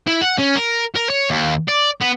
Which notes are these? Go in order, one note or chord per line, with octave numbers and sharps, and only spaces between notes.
E4
F#5
C#4
A#4
A#4
C#5
D#2
D5
B3